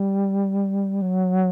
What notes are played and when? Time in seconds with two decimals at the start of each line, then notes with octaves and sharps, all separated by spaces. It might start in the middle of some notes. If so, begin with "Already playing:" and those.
Already playing: G3
1.02 F#3